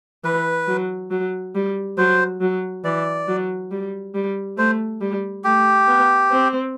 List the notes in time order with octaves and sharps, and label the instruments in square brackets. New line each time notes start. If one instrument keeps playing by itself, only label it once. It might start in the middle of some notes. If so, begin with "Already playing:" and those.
[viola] E3 [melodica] B4
[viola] F#3
F#3
G3
[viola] F#3 [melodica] C5
[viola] F#3
[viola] E3 [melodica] D5
[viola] F#3
G3
G3
[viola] A3 [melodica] C5
[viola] G3
[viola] A3 [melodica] G4
[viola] B3
C4